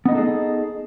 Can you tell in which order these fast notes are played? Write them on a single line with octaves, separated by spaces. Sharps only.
B3 D#5 D#4 A4 G#4